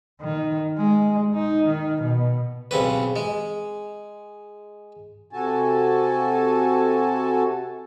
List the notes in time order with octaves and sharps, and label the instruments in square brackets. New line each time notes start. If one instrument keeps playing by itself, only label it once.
[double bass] D#3
G#3
D#4
D#3
B2
[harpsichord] B1 C#3 C4 B4
G#3
[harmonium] C3 F#4 A4 G#5 A5